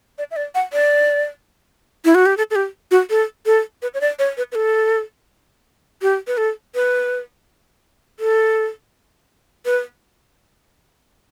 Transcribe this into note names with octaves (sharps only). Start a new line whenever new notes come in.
D5
E5
D5
F#5
D5
E4
F#4
G4
A4
A4
G4
F#4
A4
A4
B4
C#5
D5
C#5
B4
B4
A4
G4
B4
A4
B4
A4
B4